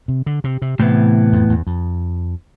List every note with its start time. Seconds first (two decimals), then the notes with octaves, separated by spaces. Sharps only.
0.08 C3
0.26 D3
0.44 C3
0.62 C3
0.79 A2 C3 E3 B3
1.32 F2
1.49 E2
1.67 F2